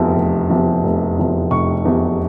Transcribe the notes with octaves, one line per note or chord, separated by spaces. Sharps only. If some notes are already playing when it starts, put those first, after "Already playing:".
Already playing: F1 E2 C3 F3
F1
E2 C3 F3
F1
E2 C3 F3
F1 C#6
E2 C3 F3